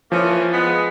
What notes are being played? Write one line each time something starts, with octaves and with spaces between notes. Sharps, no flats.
E3 F3 A#3 C#4
G#3 B3